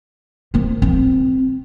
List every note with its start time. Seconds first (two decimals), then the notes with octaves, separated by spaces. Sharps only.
0.54 D#3 F3
0.82 C4